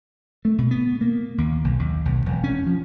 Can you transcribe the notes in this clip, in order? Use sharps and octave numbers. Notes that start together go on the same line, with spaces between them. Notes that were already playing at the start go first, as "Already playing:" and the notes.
A3
B2
B3
A#3
D#2
B1
D#2
B1
E1
C#4
F3